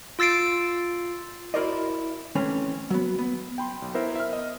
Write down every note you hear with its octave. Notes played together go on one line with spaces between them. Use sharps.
F4 E6 A6 C7 D7
E4 F#4 A#4 C5 D5 D#5
E3 A3 C4 C#4
F#3 B3
B3
G5 B5 C6
B1
B3 E4 A#4 C5 E5
E5 F6
D#5